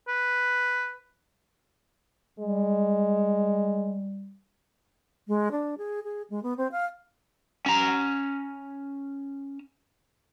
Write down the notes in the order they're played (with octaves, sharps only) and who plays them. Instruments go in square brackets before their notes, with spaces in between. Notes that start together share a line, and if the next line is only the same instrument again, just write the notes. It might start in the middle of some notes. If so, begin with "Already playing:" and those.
[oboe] B4
[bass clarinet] G3 [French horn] G#3
[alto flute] G#3
D4
G#4
G#4
G#3
B3
C4
F5
[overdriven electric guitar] C#4 A#5